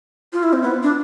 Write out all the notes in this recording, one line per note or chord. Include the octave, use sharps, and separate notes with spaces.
F4
E4
C4
B3
D4